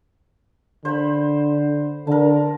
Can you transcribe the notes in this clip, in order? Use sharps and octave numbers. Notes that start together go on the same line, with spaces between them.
D3 C5 B5
D3 A#4 A5